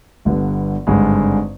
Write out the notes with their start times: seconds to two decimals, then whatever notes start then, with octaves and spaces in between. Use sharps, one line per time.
0.25 G1 G2 D3 G3 B3
0.87 G#1 G2 D3 G#3